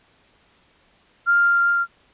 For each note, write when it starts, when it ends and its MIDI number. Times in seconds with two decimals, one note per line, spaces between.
1.27 1.82 89